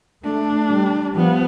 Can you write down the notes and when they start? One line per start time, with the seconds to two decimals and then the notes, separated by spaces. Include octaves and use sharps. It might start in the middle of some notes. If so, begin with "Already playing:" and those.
0.24 A3 D4
0.71 G3
1.17 F3 B3